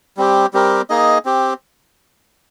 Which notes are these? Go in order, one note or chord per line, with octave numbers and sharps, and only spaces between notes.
G3 C4 G4
G3 C4 G4 A#4
A#3 D#4 G#4 D#5
C4 G4